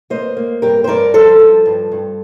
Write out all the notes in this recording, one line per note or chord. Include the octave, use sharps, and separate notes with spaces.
A#3 C5 D#5
A#3
G2 G4 A#4
C5
G2 A#4 D5
F3 A4 C5
F3
G2
G2